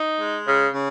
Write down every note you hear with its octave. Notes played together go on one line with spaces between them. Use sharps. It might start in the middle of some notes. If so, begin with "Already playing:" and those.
Already playing: D#4
G#3
C#3
C#3